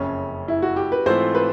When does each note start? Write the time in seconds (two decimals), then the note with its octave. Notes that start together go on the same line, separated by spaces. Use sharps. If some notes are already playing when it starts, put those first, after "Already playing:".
Already playing: F#1 F2 C#3 C#4
0.48 E4
0.62 F#4
0.76 G4
0.92 B4
1.06 G#2 E3 A3 C4 F4 C5
1.35 B4